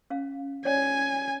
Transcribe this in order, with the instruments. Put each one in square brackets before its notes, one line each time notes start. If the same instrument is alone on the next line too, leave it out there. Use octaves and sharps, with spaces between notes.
[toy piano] C#4 F5
[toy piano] C#4 C#5 D5 [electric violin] G#5